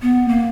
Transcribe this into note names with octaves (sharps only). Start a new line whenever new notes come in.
B3
A#3